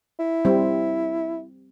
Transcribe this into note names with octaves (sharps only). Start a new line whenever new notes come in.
E4
G3 C4